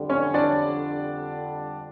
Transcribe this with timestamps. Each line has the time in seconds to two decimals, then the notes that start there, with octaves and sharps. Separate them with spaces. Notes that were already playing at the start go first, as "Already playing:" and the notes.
Already playing: F2 D3 G3
0.09 C#4 C#5
0.34 D4 D5